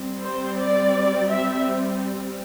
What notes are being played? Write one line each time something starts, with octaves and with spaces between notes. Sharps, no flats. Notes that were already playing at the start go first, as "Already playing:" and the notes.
Already playing: G3 C4
C5
D5
E5